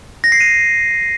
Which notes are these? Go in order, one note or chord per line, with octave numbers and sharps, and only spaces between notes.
A#6
C7
D#7